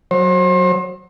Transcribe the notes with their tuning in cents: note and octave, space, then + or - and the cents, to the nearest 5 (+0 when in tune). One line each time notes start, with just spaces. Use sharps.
F#3 +0 C5 +35